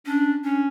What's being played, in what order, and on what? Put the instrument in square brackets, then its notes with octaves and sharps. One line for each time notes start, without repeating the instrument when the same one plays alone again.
[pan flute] C#4 [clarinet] D4
[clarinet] C#4 [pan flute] D4